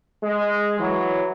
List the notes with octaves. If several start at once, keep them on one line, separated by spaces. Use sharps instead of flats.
G#3
E3 F#3